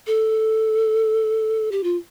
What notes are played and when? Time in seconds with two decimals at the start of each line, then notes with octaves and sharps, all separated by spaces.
0.07 A4
1.72 G4
1.83 F4